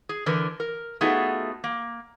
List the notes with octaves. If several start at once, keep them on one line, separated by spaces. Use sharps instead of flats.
G#4
D3 E3 A#4 B4
A#4
A3 B3 D#4 F4 F#4 G#4
A#3